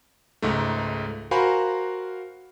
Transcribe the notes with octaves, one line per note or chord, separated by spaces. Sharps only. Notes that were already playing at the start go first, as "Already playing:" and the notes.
C#2 G#2 A3
F#4 A#4 C5 F5 G#5 B5